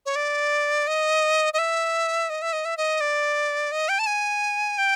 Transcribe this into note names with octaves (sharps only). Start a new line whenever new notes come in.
C#5
D5
D#5
D#5
E5
D#5
E5
D#5
E5
D#5
D5
D#5
G5
A5
G#5
G5